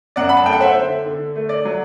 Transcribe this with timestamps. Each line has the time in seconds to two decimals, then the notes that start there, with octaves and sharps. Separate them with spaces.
0.16 F#2 D5 F#5
0.29 B5
0.37 A5
0.46 A3 G5
0.53 F#5
0.60 C5 E5
0.76 D3
1.06 D3
1.36 A3
1.49 D5
1.65 F#3